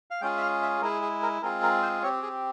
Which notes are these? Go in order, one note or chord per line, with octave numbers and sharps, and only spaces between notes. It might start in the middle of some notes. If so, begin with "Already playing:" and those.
F5
G#3 C#4 F4 G#4 G5
E5
F5
E5
G#3 E4 G#4 A#4
G#4
A#4
G#3 C4 F4 G#4 A#4
A#4
C5
C4 G4 C#5
G#4